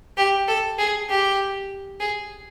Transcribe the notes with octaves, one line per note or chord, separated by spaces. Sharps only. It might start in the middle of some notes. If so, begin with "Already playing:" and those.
G4
A4
G#4
G4
G#4